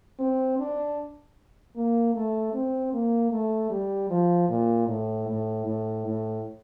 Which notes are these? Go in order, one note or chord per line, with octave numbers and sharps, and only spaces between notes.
C4
D4
A#3
A3
C4
A#3
A3
G3
F3
A#2
A2
A2
A2
A2